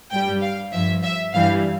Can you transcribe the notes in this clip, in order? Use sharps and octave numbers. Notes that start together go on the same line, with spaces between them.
G2 G3 G5
F5
G2 F3 E5
E5
G2 E3 G3 F5